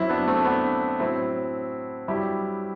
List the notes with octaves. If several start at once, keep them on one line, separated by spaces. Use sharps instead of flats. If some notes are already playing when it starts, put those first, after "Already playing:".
Already playing: F#2 F#3 C4 E4
B3 D4
A3 C4
B3 D4
A2 F#3 C4 E4
G2 F#3 E4 G4